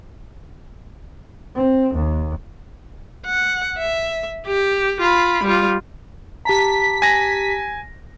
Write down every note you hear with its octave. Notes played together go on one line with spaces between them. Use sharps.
C4
D#2
F#5
E5
G4
F4 B5
G3 F4
G4 A5 A#5 B6
G#5 A#6